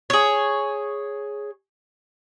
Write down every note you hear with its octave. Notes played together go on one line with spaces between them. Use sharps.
G#4 C#5